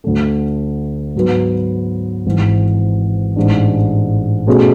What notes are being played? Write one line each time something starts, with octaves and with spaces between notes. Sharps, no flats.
D2 D3 A3
G#2 F#3 B3
G#1 G#2 E3
A1 G#2 G#3 D4
B2 A3 C#4 G#4